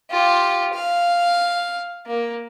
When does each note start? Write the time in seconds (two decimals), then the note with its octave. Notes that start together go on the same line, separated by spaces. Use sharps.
0.10 F4 G4
0.74 F5
2.07 A#3